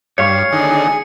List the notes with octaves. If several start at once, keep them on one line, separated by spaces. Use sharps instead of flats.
G2 C#5 F5 C#6 C#7
D3 D#3 G#4